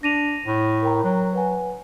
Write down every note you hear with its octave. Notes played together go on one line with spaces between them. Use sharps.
D4 A#6 D#7 F7
A2
A#4 G5 A#5
F#3
B4 F#5 G#5